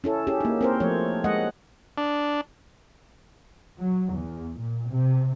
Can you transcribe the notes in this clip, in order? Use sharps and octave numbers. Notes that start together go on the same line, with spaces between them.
C#4 E4 A4
C#4 G4 G#4
A#3 D#4
C4 A#4 C5
F3 A3 C#5
G#3 D#5 F#5
D4
F#3
E2
A#2
C3